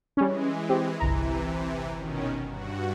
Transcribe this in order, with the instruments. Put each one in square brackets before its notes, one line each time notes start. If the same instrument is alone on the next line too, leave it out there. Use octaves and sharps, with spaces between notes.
[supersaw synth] E3 G#3 [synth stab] G3 C#4
[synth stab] C4 G4
[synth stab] G1 C2 A#5 [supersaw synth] C3 E3
[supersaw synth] B2 D#3 C#4
G2 F#4